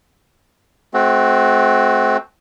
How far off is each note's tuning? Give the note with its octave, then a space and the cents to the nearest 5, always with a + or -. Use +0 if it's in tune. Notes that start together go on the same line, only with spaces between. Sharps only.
A3 -35 C4 +0 F#4 +0